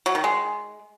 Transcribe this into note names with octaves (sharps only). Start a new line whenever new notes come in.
F#3
D#3
G#3